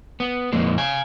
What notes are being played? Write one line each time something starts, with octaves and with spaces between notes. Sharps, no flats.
B3
F2 A#2 G#3 A#3
F5 G#5